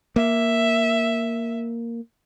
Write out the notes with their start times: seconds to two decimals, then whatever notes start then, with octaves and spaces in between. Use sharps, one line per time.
0.16 A#3 E5